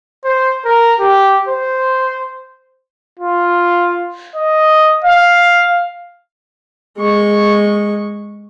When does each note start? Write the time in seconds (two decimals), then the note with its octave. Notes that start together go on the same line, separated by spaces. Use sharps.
0.25 C5
0.65 A#4
1.00 G4
1.49 C5
3.19 F4
4.36 D#5
5.04 F5
6.98 G#3 C#6